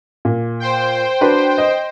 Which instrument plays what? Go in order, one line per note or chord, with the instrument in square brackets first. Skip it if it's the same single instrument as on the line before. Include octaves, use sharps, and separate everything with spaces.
[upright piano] A#2
[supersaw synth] C5 G5
[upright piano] D4 F#4 B4
D#5